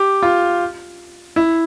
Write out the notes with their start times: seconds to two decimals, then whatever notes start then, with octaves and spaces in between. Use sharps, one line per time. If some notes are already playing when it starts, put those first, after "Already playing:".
Already playing: G4
0.23 F4
1.36 E4